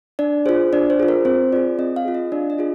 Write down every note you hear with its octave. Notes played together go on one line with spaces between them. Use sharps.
D4 D5
F4 G#4 C5
D4 D5
C5
F4 G#4
A#4
C4 C5
F4 G#4 D5
C4 D#5
F5
F4 G#4
D#5
D4 D5
D#5
F4 G#4